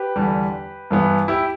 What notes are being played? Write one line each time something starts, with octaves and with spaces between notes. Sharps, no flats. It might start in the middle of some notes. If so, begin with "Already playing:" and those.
Already playing: G4 B4
E2 D3 G3
G2 E3 B3
E4 G4